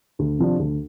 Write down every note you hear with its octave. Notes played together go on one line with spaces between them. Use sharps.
D2
C3 F3 D4
D2